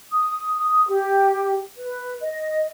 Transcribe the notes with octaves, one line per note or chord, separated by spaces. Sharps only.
D#6
G4
B4
D#5